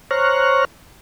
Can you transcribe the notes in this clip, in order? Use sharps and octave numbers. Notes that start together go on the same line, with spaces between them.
C5 C#5 A#5 C#6 F6 F#6